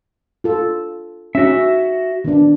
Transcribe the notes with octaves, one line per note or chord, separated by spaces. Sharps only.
F4 A4
C#4 D#4 F#4 E5
D#3 B3 D4